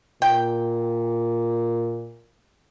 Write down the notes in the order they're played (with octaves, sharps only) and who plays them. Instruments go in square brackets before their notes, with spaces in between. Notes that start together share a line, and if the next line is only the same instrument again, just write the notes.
[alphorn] A#2 [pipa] G5